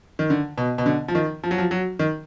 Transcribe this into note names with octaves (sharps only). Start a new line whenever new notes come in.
D#3
D3
B2
B2
D3
F3
D#3
F3
F#3
F3
F#3
D#3